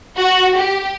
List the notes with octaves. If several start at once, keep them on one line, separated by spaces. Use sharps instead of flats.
F#4
G4